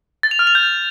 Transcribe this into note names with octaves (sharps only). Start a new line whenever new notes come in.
A6
F7
F6
F7
G6